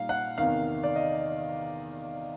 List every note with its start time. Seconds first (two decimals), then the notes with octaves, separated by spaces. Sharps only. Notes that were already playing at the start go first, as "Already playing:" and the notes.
Already playing: A#2 G3 D#4 F5
0.09 F#5
0.38 E2 C3 D#3 F5
0.84 D5
0.96 D#5